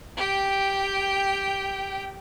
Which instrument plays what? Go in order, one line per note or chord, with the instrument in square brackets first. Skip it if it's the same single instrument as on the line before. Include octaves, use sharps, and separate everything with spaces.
[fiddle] G4 G5